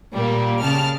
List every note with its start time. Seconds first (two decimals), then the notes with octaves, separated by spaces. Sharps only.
0.14 A#2 G3 A#3
0.61 C#3 A5 F6